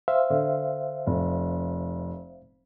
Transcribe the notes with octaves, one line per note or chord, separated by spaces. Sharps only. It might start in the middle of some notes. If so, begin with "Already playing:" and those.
C5 E5 F5
D3
F1